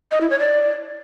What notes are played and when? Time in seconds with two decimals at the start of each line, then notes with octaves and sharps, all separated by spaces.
0.11 D#5
0.21 E4
0.30 C#5
0.39 D5